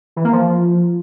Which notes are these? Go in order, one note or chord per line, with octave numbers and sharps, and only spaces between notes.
E3
A#3
F3